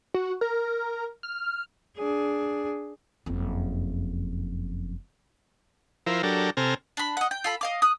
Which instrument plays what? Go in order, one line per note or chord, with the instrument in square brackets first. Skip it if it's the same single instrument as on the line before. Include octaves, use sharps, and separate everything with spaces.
[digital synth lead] F#4
A#4
F6
[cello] D4 G#4
[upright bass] F#1 F2
[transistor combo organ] F3 E4 A#4 C5
F#3 D4 G4 A4 A#4
C3 C4 A4 G#5 A#5 F6
[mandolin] D4 B5
D#5 F#5
G5
F4 A4 B5
D#5 F5 D6
D#6 F#6